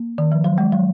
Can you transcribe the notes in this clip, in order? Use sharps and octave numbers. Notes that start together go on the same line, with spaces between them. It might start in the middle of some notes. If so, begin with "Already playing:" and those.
Already playing: A#3
D#3
F3
F#3
G#3
F#3